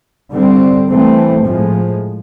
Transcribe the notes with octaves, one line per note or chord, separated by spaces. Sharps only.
D3 G3 C4
E3 A3 C4
A2 F3 G#3